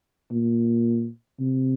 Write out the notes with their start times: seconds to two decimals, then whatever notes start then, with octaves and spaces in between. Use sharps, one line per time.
0.32 A#2
1.40 C3